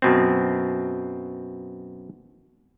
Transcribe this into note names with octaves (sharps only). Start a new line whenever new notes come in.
F#2 B2 C4